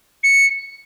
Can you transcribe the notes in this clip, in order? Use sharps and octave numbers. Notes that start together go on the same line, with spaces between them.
C#7